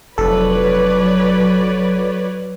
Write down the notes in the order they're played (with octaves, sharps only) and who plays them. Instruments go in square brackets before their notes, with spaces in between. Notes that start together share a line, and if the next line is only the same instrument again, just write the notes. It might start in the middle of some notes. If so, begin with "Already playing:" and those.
[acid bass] F1 [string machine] F#3 [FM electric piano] A4 [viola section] B4 C#5 D5